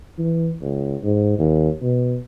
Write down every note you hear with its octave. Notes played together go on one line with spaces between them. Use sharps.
E3
C#2
G#2
D#2
B2